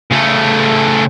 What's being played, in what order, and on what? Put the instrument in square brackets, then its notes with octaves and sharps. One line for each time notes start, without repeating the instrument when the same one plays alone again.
[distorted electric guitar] C#3 A3